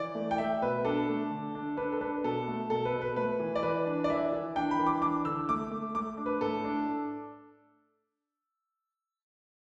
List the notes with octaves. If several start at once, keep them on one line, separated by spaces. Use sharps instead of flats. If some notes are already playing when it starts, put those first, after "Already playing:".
Already playing: E3 D5
A3
G5
A3 E5
B2 B4
D4 A4
A3
D3
D4
D4 B4
A4
D4 B4
B2 A4
A3
B2 A4
B4
B2
B4
A3 B4
E3
D5
E3 B4
D4
D5
E3 E5
E3
D4 G5
B5
E3
D6
D4 D6
D3 E6
A3 D6
A3
A3 D6
D4
B4
A2 A4
D4